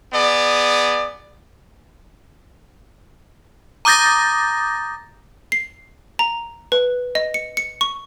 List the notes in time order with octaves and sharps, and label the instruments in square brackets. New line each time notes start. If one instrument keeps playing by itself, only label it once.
[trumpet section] B3 G#4 D5
[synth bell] A#5 D6 D#6 G6 A6 A#6
[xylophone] C7
A#5
B4
D#5
C#7
C#7
C#6